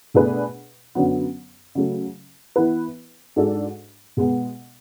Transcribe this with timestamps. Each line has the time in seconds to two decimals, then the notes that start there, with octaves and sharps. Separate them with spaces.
0.14 B2 A3 D4 G#4 B4
0.95 F#2 D3 F#3 B3
1.75 C#3 F#3 A3
2.56 E3 B3 E4 B4
3.36 G#2 G#3 D4 F#4 A4
4.17 B2 G#3 B3